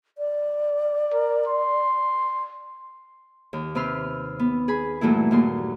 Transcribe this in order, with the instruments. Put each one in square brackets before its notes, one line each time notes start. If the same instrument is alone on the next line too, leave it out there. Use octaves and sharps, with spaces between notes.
[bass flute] D5
[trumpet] A#4
C6
[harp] D#2
C3 C4 B4 C6 F6
B3
G#4 B5
G2 A#2 E3 F#3 A3 E4
D#2 A#2 C6